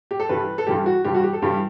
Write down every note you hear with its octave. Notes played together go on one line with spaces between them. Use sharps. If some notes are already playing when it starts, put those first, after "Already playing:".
G4
A4
G2 E3 G3 B4
A4
G2 E3 G3 G4
F#4
G2 E3 G3 G4
F#4
G4
A4
G2 E3 G3 G4